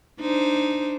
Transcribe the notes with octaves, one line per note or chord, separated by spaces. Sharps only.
D4 D#4 C5